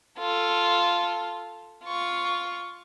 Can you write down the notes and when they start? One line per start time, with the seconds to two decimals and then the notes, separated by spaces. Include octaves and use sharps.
0.18 F4 A4
1.85 F4 C#6